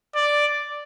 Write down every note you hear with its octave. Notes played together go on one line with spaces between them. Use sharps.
D5